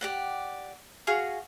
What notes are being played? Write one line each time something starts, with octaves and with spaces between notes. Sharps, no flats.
G4 D5 F#5
F#4 G#4 F5 C#6